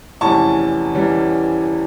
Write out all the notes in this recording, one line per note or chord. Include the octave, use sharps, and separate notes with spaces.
F1 E2 E3 G3 C#4 A5 C#6
E3 G3 C#4